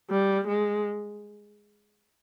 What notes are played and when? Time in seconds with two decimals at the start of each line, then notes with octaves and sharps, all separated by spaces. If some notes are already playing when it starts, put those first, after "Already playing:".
0.10 G3
0.47 G#3